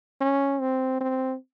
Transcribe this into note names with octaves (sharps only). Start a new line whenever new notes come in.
C#4
C4
C4